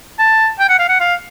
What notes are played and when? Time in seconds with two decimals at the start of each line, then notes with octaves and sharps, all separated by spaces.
0.19 A5
0.60 G5
0.69 F#5
0.79 F5
0.89 F#5
1.00 F5